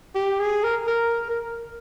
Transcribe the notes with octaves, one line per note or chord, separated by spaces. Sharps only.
G4
G#4
A#4
A#4
A#4